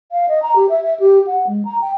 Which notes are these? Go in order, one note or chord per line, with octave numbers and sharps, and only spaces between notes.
F5
D#5
A#5
G4
E5
E5
G4
F#5
G#3
A#5
G5